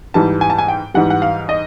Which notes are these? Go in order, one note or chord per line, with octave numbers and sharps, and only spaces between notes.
G#2 E3 G3 A5
G#5
A5
G#5
G5
G#2 E3 G3 F#5
F#5
F5
D#5